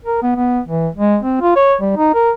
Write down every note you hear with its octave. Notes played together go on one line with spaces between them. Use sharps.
A#4
B3
B3
E3
G#3
C4
F4
C#5
G3
D#4
A#4